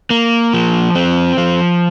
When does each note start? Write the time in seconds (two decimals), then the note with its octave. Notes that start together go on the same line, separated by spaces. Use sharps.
0.10 A#3
0.54 F3
0.95 C4
1.37 F3